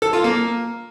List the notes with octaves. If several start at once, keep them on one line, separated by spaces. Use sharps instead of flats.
A4
F4
A#3